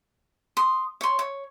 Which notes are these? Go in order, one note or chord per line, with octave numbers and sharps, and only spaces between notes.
C6 D#6
C#5 C6
C#5